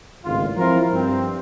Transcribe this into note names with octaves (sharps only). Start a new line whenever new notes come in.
G#1 C#2 A2 F4
F3 C4 E4 F4 A#4
G2 C4